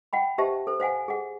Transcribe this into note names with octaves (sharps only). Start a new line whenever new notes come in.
F#5 G5 B5
G4 C5 E5 A5
A4 C5
C5 F5 F#5 G#5
G#4 F#5